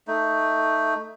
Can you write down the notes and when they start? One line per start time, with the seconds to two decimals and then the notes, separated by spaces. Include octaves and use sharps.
0.07 A3 D#4